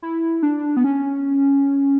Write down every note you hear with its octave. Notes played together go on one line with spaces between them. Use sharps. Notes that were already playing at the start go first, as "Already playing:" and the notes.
E4
D4
B3
C#4